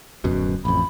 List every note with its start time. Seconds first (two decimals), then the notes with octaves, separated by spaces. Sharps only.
0.24 D1 F#2 B2
0.65 A1 F2 B5